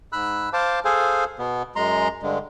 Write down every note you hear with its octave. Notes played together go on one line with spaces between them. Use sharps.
G#2 B5 E6 F#6
C5 F5 A5 D6
G#4 A4 C5 F5 G#5
B2 B3
F#2 G#3 A#5 C6
G2 D3 G#3